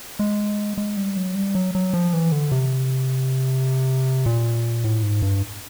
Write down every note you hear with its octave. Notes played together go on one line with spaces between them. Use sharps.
G#3
G#3
G3
F#3
G3
F#3
F#3
F3
E3
D3
C3
A#2
A2
G#2
G2